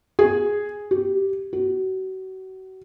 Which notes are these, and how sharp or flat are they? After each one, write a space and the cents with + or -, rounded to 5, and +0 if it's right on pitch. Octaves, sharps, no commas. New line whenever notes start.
G#4 +0
G4 -10
F#4 +35